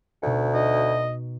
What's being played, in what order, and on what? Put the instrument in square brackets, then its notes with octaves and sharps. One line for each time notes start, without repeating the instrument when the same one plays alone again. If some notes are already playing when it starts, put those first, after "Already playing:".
[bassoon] D2 [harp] B2 D#4 C#7
[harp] D#4 F#4 [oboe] D#5